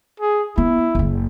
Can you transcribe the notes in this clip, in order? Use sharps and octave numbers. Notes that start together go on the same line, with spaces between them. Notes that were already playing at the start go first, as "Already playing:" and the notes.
G#4
B3 E4
F#1 F#3